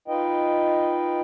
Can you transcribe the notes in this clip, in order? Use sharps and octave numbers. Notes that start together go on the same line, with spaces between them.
D#4 F4 B4 D#5 G5